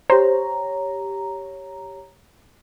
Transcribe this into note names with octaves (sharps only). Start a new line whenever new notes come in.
G4 C5 C#5 A#5